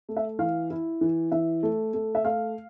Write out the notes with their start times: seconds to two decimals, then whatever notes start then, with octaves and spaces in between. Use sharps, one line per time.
0.09 A3
0.17 E5
0.39 E3 F5
0.70 E4
1.01 E3
1.32 E3 E5
1.63 A3
1.94 A3
2.15 E5
2.24 A3 F5